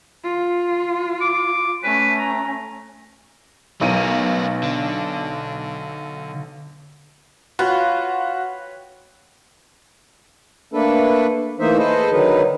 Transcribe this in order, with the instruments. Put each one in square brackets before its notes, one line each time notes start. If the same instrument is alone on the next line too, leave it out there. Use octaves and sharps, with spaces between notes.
[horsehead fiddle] F4
[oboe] D6
[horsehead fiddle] A3 C#4 [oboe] B4
[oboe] A#5
[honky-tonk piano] B1 D#7 [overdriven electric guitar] B3 A#4
[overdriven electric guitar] D3
[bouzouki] F4 [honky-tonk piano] F#4 [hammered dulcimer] B4 C#5 G5
[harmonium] A3 A#3 D4 A4 B4
E3 A3 A#3 D#4 C5 E5
G#4 A4 B4 C5 D#5
D3 D#3 F#3 D#4 B4